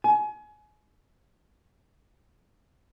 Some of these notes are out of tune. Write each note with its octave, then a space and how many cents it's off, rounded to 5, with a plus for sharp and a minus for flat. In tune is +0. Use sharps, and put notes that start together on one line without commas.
G#5 +30